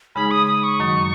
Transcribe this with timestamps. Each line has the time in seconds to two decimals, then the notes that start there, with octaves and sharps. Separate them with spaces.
0.15 C#3 G#3 D#4 G#4 B5
0.31 D#6
0.47 D#6
0.63 C#6
0.80 F#2 D#3 F#3